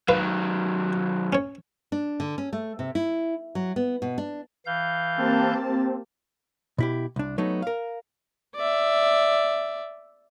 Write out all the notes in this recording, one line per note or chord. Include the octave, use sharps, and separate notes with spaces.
D#3 F#3 F4 B4 F5
C#4 C#5
D4
D3
C#4
A3
C3
E4
F#3
B3
B2
D4
E3 F5 G6
A#3 C4 G4 A5
B2 E4 G4
C2 D4
F#3 A3 B3 D#4
A#4 F5
D5 E5